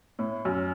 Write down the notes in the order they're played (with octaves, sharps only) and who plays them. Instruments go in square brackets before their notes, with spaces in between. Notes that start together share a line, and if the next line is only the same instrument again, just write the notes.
[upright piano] A2
F#2